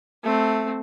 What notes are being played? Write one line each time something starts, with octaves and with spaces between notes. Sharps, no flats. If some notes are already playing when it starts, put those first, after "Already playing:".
A3 C4